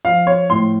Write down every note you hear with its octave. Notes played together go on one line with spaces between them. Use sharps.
F3 F5
C#5
A2 C6